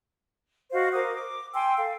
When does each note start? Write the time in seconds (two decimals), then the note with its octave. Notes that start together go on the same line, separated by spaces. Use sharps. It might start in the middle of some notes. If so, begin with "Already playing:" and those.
0.72 F#4 C5 D#5 F5
0.93 A#4 C5 D6 D#6
1.14 D6
1.54 G5 G#5 C6 E6
1.77 A4 F5